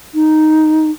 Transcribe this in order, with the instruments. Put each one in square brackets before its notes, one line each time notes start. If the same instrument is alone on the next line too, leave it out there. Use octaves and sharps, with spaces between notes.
[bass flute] D#4